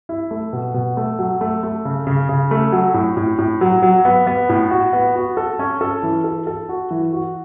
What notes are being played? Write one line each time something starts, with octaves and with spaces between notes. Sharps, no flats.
E4
A3
B2
B2
A3
F#3
A3
A3
C#3
C#3
C#3
A3
F#3
A2
A2
A2
F#3
F#3
B3
B3
A2
F#4
B3
F#4
A4
C#4
A4
E3
A4
A4
F#4
E3
F#4